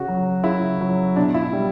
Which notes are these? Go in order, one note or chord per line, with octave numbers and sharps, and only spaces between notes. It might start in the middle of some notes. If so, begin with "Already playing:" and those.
Already playing: C#3 F#4
F#3
C#3 E4
F#3
B2 D4
E4
G3